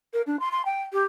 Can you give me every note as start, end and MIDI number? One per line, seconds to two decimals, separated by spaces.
0.14 0.22 70
0.27 0.39 62
0.40 0.52 84
0.52 0.62 84
0.66 0.82 79
0.93 1.04 67